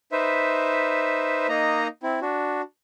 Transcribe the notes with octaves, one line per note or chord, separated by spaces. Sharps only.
D#4 B4 C5 E5
A#3 D#4 D#5 A#5
C4 E4
D4 F#4